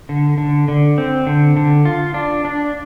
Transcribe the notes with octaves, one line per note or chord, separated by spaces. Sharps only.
D3
D3
D3
C4
D3
D3
F4
D4
D4